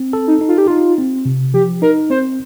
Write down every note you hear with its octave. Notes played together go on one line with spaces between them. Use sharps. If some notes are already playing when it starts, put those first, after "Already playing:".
Already playing: C4
A4
D#4
D#4
F4
G4
D#4 F4
C4
C3
F3 G4
D#4 A#4
C4 C5